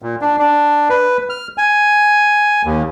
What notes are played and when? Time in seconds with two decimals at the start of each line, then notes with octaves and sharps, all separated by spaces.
0.02 A#2
0.21 D4
0.39 D4
0.90 B4
1.30 F6
1.58 G#5
2.65 D#2